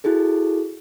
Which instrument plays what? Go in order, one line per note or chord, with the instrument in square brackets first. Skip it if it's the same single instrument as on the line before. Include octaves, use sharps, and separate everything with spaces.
[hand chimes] E4 F#4 G#4 A4